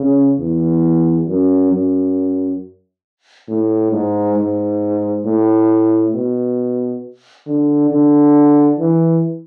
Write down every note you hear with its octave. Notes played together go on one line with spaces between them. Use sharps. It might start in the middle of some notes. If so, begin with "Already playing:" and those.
Already playing: C#3
E2
F#2
F#2
A2
G#2
G#2
A2
B2
D3
D3
E3